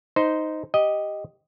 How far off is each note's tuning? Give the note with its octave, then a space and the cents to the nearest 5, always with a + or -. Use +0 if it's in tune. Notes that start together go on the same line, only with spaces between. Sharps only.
D#4 +5 C5 -15
G4 +0 D#5 +0